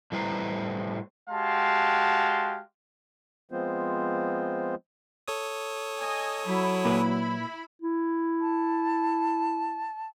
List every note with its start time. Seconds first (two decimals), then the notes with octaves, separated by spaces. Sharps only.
0.12 A2 G3 E4 B4 C5 A#5
1.29 G#3 F#4 G4 F5 A5 C6
3.51 F3 G#3 B3 C4 F4 C5
5.28 A4 C#5 D#6
6.01 D#5 G#5
6.46 F#3 E4 B5
6.85 A#2 A#4 B4
7.82 E4
8.41 A5